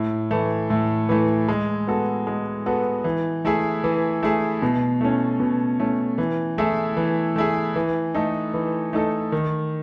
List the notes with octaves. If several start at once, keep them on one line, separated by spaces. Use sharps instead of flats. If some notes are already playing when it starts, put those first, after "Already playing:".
Already playing: A2
E3 A3
A2
E3 A3
G#3
B3 F#4 A4
G#3
B3 F#4 A4
E3
A3 E4 G#4
E3
A3 E4 G#4
B2
A3 C#4
B2
A3 C#4
E3
A3 E4 G#4
E3
A3 E4 G#4
E3
A3 D#4 A4
E3
A3 D#4 A4
D#3